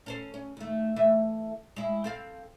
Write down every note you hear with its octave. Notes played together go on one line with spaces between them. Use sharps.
C#4 A4 C5
C#4
D#2 A3
E3 A3 E5
G#3 E4
C4 A4 F5